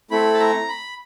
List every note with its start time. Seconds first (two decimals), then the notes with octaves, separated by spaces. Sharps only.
0.11 A3 C4 E4 A4 B5
0.34 A5
0.40 A#5
0.69 B5